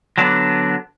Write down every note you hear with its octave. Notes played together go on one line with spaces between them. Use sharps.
D3 F#3 B3 D4